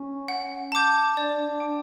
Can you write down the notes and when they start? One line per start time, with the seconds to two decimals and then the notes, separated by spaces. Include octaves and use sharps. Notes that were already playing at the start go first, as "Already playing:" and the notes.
Already playing: C#4
0.28 F#5
0.72 A5 D6 G6
1.17 D4 D5
1.45 D4
1.60 G5 D6